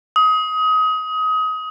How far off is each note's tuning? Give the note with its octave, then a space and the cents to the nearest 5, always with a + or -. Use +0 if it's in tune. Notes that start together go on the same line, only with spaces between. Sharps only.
D#6 +25